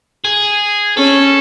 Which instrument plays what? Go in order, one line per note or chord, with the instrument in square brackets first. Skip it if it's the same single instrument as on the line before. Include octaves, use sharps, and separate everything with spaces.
[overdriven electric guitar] G#4
[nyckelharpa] C#4 [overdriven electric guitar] A4